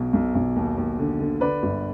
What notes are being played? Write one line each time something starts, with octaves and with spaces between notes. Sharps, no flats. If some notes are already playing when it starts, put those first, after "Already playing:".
Already playing: B1 B2
B1
B1
D#2
D#2
D3
D3
D3 B4 D5
G1